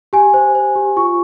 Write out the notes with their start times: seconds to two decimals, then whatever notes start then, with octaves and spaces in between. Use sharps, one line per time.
0.13 G4 G#5
0.34 C5
0.55 C5
0.75 G4
0.97 F4 C#6